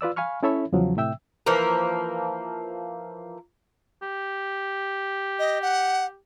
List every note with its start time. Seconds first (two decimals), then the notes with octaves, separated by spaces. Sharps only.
0.01 F4 B4 D5 E6
0.16 F5 G#5 B5 C#6 F6
0.43 C#4 E4 A4 C#5 E5 B5
0.72 E2 C#3 F3 F#3
0.97 A2 C3 E5 G5 E6
1.46 E3 F3 A#3 A#4
4.02 G4
5.39 D#5
5.62 F#5